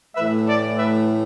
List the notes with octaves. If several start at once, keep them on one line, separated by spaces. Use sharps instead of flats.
A2 E3 A3 B4 E5
A4 D5
B4 E5